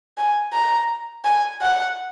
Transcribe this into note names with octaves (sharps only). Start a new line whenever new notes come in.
G#5
A#5
G#5
F#5